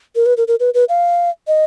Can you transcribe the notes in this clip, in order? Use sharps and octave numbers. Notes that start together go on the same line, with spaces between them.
A#4
B4
A#4
A#4
B4
B4
F5
D#5